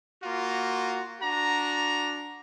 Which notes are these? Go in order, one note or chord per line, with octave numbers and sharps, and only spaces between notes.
A#3 F4 F#4
D4 F#4 A#5